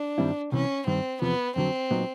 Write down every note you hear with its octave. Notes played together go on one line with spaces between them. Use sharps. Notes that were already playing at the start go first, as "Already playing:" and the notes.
Already playing: D4
G2 D#3 G3 C4 E4
C2 C3 E3 C#4
G2 D#3 G3 C4
E2 C3 F3 B3
F2 D3 F#3 C4
A#2 F#3 B3 D#4